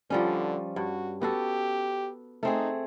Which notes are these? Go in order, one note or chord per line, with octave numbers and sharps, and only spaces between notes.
D3 F3 G3 C#4
G2 F#4
B3 F#4 G4 A4
A3 C4 D#4 G#4